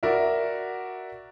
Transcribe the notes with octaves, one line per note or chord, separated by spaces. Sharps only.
F#4 A#4 D5 E5